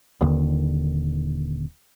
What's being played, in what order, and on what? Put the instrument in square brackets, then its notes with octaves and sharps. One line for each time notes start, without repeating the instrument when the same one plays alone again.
[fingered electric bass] D#1 D#2 D3